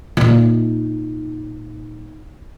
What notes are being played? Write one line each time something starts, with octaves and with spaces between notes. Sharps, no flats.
A#2 D#4